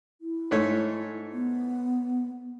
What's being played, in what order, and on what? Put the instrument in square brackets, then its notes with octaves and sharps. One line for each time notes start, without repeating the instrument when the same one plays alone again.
[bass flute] E4
[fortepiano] G#2 A3 C#5
[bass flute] B3